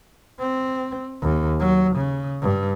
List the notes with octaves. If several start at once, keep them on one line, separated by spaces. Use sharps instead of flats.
C4
D#2
F#3
C#3
G2